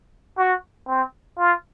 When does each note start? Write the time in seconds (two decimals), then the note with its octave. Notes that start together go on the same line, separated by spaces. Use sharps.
0.38 F#4
0.87 C4
1.38 F4